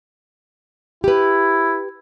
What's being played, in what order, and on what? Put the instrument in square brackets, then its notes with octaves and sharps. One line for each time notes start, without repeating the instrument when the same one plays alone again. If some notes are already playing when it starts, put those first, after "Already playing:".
[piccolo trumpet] E4 [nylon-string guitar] G4 B4